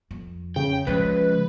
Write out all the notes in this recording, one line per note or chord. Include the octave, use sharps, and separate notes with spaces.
F2
C#3 G5
C#2 C#3 F3 B4